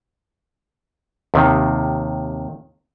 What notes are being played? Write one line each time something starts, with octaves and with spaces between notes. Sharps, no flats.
D#2 C3 D#3